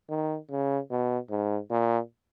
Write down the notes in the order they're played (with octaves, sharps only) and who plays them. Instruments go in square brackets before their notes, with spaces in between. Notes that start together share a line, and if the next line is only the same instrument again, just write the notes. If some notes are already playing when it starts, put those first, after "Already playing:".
[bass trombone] D#3
C#3
B2
G#2
A#2